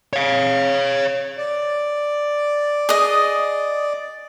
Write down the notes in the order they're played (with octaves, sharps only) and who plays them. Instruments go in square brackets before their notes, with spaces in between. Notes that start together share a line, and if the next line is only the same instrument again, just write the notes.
[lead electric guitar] C#5 F5
[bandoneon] D5
[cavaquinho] G#4 D#5